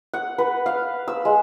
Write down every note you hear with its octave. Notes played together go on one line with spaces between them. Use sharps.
F#5
B4
F5
E6
G#3